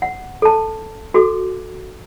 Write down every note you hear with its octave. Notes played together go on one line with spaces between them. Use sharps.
F#5
A4 A5
F#4 A4 D6